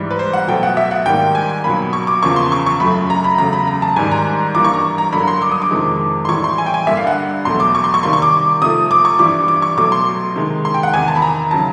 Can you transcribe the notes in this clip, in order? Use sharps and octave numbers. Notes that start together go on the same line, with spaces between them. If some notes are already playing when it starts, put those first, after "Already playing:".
Already playing: G#2 E3 G3
B4
C5
F#5
B2 F#3 A3 G5
F#5
E5
F#5
G#2 D#3 G3 A#3 G5
G#5
B2 F#3 A#3 B5
C#6
D6
E2 C#3 F3 A#3 C#6
C6
C#6
C#6
F#2 C#3 F#3 A3 B5
A#5
B5
E2 C#3 F#3 A3 A#5
B5
A#5
A5
G#2 D#3 G3 G#5
A#5
G2 E3 G3 A#3 D6
C#6
A#5
A#5
G2 D3 F#3 A#3 B5
C6
D6
D#6
D6
F2 C3 D#3 G#3
C6
A2 E3 G3 C#6
C6
G#5
G5
G#5
G2 D3 G3 A#3 E5
F5
F#5
E2 B2 F#3 A3 C6
D6
C#6
C6
C#6
C3 D#3 G3 A#3 C6
C#6
D6
C3 F3 A3 D#6
D6
C#6
G2 E3 G3 D6
D6
C#6
B2 F#3 A3 D6
C6
C3 D#3 G#3
C6
G5
F#5
E2 C3 D#3 G#5
A5
B5
A#5
C#3 F#3 A5